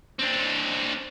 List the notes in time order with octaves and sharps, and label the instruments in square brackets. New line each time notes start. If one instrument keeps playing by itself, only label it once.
[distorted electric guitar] C4 D4